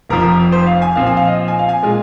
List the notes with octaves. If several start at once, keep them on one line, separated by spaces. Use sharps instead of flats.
F1 F2 F3 A#4
C5
F5
G#5
A#2 F3 C4 F5
G#5
F5
D#5
G#5
F5
G#5
A#2 G#3 F4